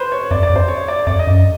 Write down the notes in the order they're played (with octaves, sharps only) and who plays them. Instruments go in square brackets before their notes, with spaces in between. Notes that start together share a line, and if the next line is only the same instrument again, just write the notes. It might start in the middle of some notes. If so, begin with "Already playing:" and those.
Already playing: [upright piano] B4 C5
C#5
[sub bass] F2 [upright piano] D5
[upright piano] D5
[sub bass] F2
[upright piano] C5
C#5
D5
[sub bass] F2 [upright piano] D5
[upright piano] D#5
[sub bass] F#2